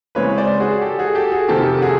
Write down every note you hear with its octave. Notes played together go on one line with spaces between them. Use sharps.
C#3 E3 G#3 C4 B4 C#5
C5 D5
F#4 G#4
G4 A4
F#4 G#4
G4 A4
F#4 G#4
F2 C3 D#3 G4 A4
F#4 G#4